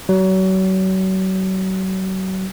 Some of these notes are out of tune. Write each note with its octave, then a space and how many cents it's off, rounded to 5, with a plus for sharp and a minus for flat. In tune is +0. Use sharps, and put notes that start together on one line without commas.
F#3 +35